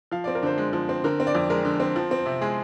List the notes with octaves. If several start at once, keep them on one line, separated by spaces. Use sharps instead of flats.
F3 F5
C4 D5
A#4
D3 C5
G#3
F3
C4
D3 A#4
C4
D5
F2
G#3 A#4
D3
C4
F3
C4
C3
G#3 G#4